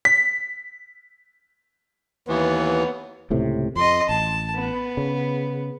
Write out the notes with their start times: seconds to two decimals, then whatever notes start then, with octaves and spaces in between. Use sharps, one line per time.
0.05 B6
2.29 D#2 E3 B3 C#5
3.30 C#2 A2 C3
3.76 F2 D#5 C6
4.09 A1 A5
4.55 B3
4.97 C#3